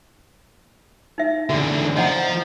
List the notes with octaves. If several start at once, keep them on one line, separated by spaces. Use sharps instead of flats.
D#4 E5
E2 D3 F#4
F3 D#5 F#5 A#5